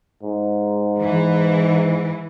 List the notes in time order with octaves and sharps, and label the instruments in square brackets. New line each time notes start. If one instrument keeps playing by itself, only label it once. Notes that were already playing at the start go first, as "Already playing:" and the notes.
[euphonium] G#2
[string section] E3